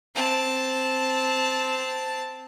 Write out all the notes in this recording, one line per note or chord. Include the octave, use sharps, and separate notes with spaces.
C4 A5